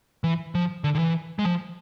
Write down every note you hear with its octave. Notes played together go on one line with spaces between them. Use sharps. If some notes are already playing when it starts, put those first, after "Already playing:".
E3
F3
D3
D3
E3
G#3
F3